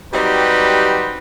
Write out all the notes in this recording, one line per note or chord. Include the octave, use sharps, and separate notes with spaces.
F#3 G3 C4 D#4 G4 B4